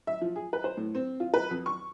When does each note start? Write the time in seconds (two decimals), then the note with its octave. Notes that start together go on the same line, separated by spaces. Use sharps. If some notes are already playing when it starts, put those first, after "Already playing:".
0.07 E5
0.21 F3
0.36 G#4
0.53 B4
0.64 C5
0.77 A2
0.95 C4
1.20 F4
1.34 B4
1.51 F2
1.66 C#6